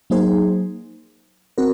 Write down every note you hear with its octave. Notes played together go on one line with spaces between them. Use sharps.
F#3 A#3 D#4 G#4 C5
C4 F#4 A#4